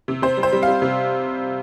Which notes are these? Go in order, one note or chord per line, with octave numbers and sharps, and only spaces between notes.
C3
C3 C5
G3
C5
G3
G3 F5
C3